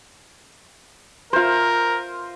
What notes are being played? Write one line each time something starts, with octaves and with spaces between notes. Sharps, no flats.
F4 A#4 C5